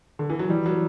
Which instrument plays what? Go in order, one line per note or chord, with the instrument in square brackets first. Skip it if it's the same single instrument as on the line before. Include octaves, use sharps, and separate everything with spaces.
[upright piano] D3
E3
F#3
[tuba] E3 [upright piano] G3
[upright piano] F#3